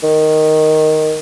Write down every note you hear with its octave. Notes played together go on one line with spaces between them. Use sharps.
D#3